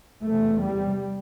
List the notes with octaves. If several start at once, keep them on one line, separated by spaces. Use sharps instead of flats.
E2 C3 A3
G3